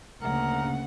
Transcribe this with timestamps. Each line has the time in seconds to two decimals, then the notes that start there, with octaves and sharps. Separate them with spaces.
0.22 D2 C#3 A#3 A#4 F#5